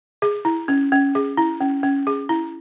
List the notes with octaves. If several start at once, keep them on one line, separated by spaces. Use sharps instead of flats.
G#4
E4
C#4
C#4
G#4
E4
C#4
C#4
G#4
E4